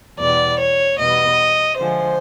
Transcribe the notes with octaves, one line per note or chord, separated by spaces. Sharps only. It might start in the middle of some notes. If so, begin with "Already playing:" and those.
E2 B2 G3 D5
C#5
E2 B2 G3 B3 D#5
D3 F3 G#3 C5